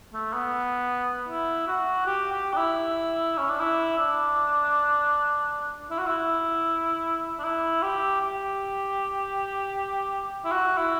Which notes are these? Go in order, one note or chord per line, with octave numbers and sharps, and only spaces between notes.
A3
B3
E4
F#4
G4
G4
D4
E4
C#4
D4
E4
D4
E4
F#4
E4
D4
E4
G4
G4
E4
F#4
E4